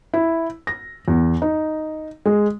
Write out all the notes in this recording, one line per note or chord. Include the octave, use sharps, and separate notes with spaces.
E4
A#6
E2
D#4
G#3